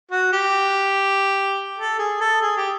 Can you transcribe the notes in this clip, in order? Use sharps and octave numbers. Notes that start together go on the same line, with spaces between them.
F#4
G4
A4
G#4
A4
G#4
G4